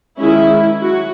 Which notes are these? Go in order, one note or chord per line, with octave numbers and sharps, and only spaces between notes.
D#3 G#3 C#4 E4
F#3 F#4